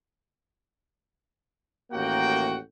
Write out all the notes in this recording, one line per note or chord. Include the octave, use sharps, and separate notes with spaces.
A1 D#2 A#3 F#4 F#5 G5